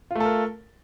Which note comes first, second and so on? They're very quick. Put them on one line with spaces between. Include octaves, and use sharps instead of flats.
F4 A3 A4 A#4